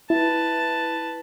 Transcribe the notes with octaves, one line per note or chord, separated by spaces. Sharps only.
E4 B4 A5